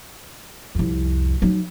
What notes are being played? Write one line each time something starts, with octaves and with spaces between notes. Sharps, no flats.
C2 F2
F#3 D#4